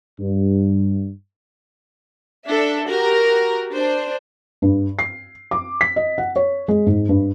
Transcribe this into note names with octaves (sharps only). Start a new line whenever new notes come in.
G2
D4 A4 E5
F#4 G4 A#4 A#5
D4 C5
G2
C7
D6
B6
D#5
F#5
C#5
G#3
G#2
G2